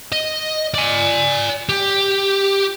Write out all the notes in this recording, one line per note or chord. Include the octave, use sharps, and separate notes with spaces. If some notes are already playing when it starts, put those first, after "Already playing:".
D#5
D5 G#5
G4